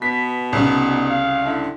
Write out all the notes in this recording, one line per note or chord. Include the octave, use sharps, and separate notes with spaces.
B2 B3 B6
C2 C#3 D#4
F5
D3 E4